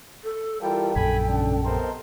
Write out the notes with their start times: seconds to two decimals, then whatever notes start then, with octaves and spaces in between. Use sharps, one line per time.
0.24 A4
0.62 E3 G3 F4 A4 A#4 G5
0.96 A#1 F#2 A4 G#5 B5
1.29 G#2 C#3 D4
1.65 C3 B3 A4 A#4 C5 D#5